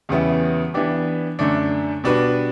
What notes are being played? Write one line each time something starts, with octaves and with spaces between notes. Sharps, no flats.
E2 C#3 G3 B3 E4
E3 B3 D4 G4
F#2 D3 A3 D4
B2 G3 D4 F#4 B4